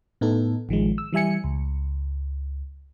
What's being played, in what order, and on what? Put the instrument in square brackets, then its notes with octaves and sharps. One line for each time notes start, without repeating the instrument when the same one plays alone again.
[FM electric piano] A2 B3 D#4 A4
A1 D#3 F3 G#3
E6
E3 G3 E5 G#5 C#7
C#2